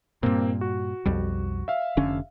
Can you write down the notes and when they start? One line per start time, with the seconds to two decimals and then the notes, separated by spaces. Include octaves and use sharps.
0.23 G2 A#2 A#3 C4
0.61 F#4
1.06 B1 F2 G3
1.68 E5 F5
1.97 F1 D3 C#4